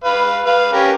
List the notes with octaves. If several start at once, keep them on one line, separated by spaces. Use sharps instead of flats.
B4 F5
B4 F5
C#4 G4 A#4